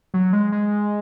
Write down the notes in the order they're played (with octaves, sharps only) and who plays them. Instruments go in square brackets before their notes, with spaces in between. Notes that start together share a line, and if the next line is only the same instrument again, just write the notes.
[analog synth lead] F#3
G#3
G#3